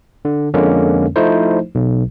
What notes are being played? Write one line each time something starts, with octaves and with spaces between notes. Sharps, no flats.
D3
F2 D3 G#3 A#3 C#4
F3 A3 D#4 E4 C5
B1